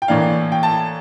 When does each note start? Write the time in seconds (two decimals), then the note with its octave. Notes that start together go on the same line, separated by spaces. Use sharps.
0.02 G5
0.08 A2 E3 A#3 D4 F5
0.52 G5
0.63 A5